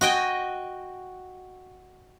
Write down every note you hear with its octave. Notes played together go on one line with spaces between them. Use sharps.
F#4 D#5 G5 G#5